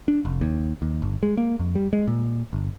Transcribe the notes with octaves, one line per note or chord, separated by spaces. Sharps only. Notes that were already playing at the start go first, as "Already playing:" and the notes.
D4
F1
D#2
D#2
G1
G#3
A#3
F2
G3
G#3
A#2
G1